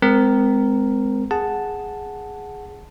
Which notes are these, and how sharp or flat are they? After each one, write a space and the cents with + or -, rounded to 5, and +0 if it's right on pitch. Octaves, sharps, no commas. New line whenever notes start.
G#3 +0 C4 -25 A#4 +0
G#4 +0 F#5 +0 A5 +0